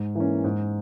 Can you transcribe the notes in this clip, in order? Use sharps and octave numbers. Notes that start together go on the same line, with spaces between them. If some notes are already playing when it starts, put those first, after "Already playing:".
Already playing: G#2
E3 A#3 C#4
G#2